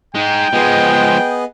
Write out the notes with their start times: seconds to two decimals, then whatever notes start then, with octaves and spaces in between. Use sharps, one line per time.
0.15 G#3 D#4 G5
0.53 F3 G#3 B3 G#4 D#5